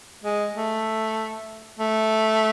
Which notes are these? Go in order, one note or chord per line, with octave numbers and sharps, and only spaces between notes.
G#3
A3
A3